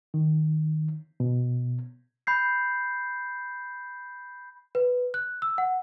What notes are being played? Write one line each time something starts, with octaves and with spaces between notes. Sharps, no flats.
D#3
B2
B5 G6 C7
B4
F#6
E6
F#5